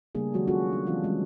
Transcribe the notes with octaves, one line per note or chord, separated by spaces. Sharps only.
C#3 G3 A3 A#3 D4 G#4
D#3 F#3 G#3 F#4 G4
C#4 F4 F#4 G#4 A4
D4
E3 F#3 C4 F4
G3 G#3 C#4